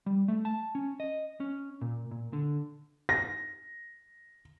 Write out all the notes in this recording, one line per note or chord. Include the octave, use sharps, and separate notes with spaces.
G3
A3
A5
C#4
D#5
C#4
A#2
A#2
D3
A#6